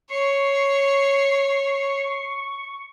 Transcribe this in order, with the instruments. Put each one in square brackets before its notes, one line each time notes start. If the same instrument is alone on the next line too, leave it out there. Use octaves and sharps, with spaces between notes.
[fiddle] C#5 [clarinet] C#6 [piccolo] C7